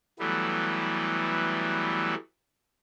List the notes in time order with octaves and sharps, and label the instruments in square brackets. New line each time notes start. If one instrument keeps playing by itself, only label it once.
[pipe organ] E3 F#3 G3 A3 B3